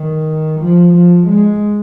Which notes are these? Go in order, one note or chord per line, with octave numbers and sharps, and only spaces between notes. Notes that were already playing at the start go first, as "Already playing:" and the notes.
Already playing: D#3
F3
F3
G#3